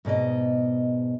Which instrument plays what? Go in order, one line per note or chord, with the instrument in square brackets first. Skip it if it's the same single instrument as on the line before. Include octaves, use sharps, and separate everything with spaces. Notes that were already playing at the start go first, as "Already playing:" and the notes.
[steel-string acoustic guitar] G#2 B2 D5 D#5